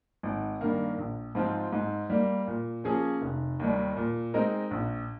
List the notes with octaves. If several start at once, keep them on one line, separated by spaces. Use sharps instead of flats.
G#1
G2 D#3 A#3
A#1
G#2 F3 C4 F4
G#2
G3 A#3
A#2
F3 A#3 C#4 G#4
F1
D#2 D#3 G3
A#2
G#3 C4 D#4 A#4
A#1